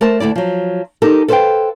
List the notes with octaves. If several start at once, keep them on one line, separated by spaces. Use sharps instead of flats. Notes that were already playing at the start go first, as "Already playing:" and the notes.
A3 A#4 C5 A5
D2 A3 E4 D5
F3 F#3
D#4 G4 A4 A#4
A4 B4 C5 E5 F5 G5